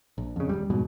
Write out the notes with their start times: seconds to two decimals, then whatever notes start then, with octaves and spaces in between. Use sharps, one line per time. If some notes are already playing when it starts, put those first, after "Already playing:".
0.18 A#1
0.36 F2 C#3
0.49 D#1 C2 G3
0.70 F2 G#2 B2